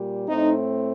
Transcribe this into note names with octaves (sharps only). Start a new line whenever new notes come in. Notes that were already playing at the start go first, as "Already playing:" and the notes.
Already playing: A#2 G3
A2 A3 C4 D#4